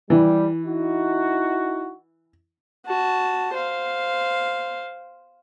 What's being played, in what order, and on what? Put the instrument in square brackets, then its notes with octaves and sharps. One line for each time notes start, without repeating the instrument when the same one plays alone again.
[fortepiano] E3 [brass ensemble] G3
[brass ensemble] D#4 E4 F#4
[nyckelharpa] F#4 A5
C5 F5